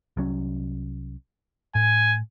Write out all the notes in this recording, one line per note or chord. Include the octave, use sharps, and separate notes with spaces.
C2 F#3 C#4
A2 G#5